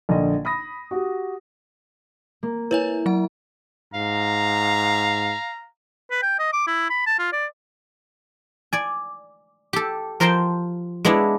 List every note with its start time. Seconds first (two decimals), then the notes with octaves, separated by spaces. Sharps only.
0.09 A#1 D3 D#5
0.45 B5 D#6 A#6
0.91 F#4 G4
2.43 A#3
2.71 E4 B4 C#5 G#5
3.06 F#3 F#5
3.94 G#2 F5 A#5
6.11 B4
6.23 G5
6.39 D#5
6.53 D6
6.67 E4
6.89 B5
7.06 A5
7.19 F4
7.33 D5
8.73 D5 G#5
9.73 G4 A4
10.20 F3 A#4 C5 G5 A5 C6
11.05 G#3 B3 D4 E4